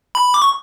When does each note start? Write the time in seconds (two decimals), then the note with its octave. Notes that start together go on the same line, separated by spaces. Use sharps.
0.15 B5
0.34 D6
0.42 C#6